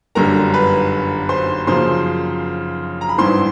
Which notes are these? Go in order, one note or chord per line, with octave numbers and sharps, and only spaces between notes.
G1 F#2 D3 G3 A#4 A#5
B4 B5
C5 C6
F#2 C#3 F3 A#3 C5 C6
A#5
B5
G#1 G2 E3 C5 C6